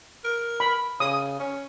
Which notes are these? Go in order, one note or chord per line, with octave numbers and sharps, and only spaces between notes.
A#4
B5
C#3 D#6
C#4